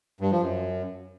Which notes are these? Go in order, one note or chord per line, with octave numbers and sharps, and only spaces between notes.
G2
F3
F#2